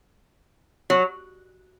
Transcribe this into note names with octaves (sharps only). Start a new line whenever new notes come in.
F#3